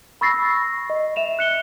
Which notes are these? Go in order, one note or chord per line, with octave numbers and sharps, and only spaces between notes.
B5 C#6 E6 A6 A#6 C7
D#5
E5 E7 F7
F#6 C#7 G7